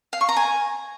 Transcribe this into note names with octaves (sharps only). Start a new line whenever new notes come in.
F5
C#6
A#5
G#5